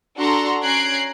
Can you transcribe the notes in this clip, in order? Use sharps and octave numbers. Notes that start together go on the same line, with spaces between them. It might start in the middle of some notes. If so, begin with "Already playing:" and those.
D4 F#4 A4 F#5 A#5 C6
C#4 A#5 F#6 G#6 C7 D7